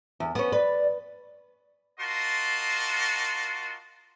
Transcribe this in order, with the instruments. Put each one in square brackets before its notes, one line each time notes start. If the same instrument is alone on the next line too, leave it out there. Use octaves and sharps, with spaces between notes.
[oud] E2
B3 C#4
[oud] B4 [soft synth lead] D5
[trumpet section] F4 F#4 A#4 D#5 A5 C6